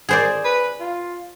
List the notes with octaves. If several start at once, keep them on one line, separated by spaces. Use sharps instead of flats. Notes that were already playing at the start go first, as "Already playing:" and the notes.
G#4 C5 D5
B4
F4